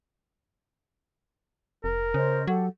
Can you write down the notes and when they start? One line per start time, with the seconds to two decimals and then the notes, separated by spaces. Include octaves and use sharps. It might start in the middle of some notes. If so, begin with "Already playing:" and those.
1.84 F1 A#4
2.14 C#3 C#4 C5 D#5
2.48 F#3 G4 A4 F#5